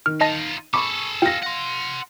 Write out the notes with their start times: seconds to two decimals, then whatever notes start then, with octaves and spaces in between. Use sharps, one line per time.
0.06 D#3 F6
0.21 D#4 F4 D#5 A5 A#6
0.74 G#4 A4 B5 C#6 D6
1.22 F4 G5 A#6
1.43 F#5 C6